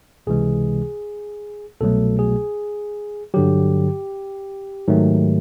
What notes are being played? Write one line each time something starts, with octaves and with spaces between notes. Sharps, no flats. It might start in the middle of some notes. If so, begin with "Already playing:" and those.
C#2 C3 E3 G#3 G#4
C2 B2 F#3 A3 A4
G#4
G2 D3 F#3 G4
G#2 D#3 F#3 A3